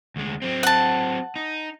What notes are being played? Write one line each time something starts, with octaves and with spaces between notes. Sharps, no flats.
D2 G#3
F#3 C4
F#5 A5
D#4